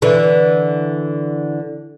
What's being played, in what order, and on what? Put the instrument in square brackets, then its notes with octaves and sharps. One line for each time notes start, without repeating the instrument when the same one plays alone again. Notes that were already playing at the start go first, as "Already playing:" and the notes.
[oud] D3 E3